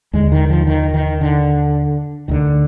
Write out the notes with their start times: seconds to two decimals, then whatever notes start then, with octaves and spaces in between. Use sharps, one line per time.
0.13 D#2 D3 G#3
0.32 D#3
0.50 F3
0.67 D#3
0.94 D#3
1.21 D3
2.28 D2 D3 D#3